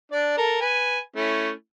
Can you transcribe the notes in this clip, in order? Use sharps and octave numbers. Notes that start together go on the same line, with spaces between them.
D4 D5
A4 A#4
B4 G#5
A3 C#4 E4